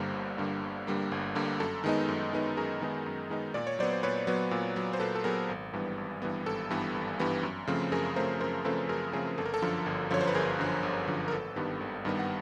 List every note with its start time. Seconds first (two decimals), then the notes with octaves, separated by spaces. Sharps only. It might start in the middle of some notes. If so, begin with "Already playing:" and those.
Already playing: G1 G2 D3 G3 A#3 A#4 C5
0.14 G1
0.38 G2 D3 G3 A#3
0.63 G1
0.87 G2 D3 G3 A#3
1.12 G1
1.35 G2 D3 G3 A#3
1.60 F#2 A4
1.84 D#3 G#3 B3 D#4
2.08 F#2
2.33 D#3 G#3 B3 D#4
2.57 F#2 G#4 A#4
2.82 D#3 G#3 B3 D#4
3.06 F#2
3.30 D#3 G#3 B3 D#4
3.54 A#2 D5
3.67 C#5
3.79 F#3 B3 C5 D5
3.93 C5
4.03 A#2 B4 C#5
4.27 F#3 B3
4.51 A#2
4.76 F#3 B3
4.93 C5
5.00 A#2 A4 B4
5.15 A4
5.24 F#3 B3 G#4 A#4
5.49 G#1
5.73 G2 E3 G3 B3
5.98 G#1
6.22 G2 E3 G3 B3
6.46 G#1 A4
6.70 G2 E3 G3 B3
6.94 G#1
7.19 G2 E3 G3 B3
7.43 F#2
7.67 C#3 F3 A3 C4
7.92 F#2 G#4 A#4
8.16 C#3 F3 A3 C4 A#4 C5
8.40 F#2 A#4 C5
8.65 C#3 F3 A3 C4 A4 B4
8.89 F#2 G#4 A#4
9.13 C#3 F3 A3 C4 G#4
9.38 G1 A4
9.45 A#4
9.54 A4
9.62 F#2 D3 F3
9.86 G1
10.11 F#2 D3 F3 C#5
10.21 C5
10.27 B4
10.35 G1 G#4 A#4
10.59 F#2 D3 F3
10.83 G1
11.07 F#2 D3 F3
11.28 A#4
11.32 G#1 A4 B4
11.56 G2 D#3 G3 B3
11.80 G#1
12.05 G2 D#3 G3 B3
12.19 F#5